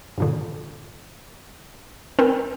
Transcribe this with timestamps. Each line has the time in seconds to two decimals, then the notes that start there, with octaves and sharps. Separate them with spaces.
0.18 G2 A#2 D3
2.19 C4 A#4 B4 G5 G#5